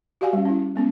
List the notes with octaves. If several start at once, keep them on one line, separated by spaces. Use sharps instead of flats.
F#4 G4 D5 F5 F#5 G#5
G3 C#4
C#4 E4
G#3 B3 C#4